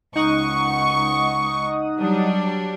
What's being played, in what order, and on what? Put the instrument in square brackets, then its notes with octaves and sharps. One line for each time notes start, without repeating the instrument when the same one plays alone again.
[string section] C#2 C#6 [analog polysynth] D#4 F#5 D#6
[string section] F#3 G3 D4